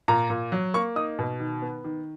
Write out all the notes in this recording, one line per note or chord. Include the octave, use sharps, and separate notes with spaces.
A#2 A#5
A#2
F#3
A#3 C#6
D#4 D#6
B2
D#3
B3
D#3